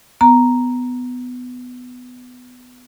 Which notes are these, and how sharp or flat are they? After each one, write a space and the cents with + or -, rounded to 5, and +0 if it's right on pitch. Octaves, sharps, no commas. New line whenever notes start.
B3 +15 A#5 +0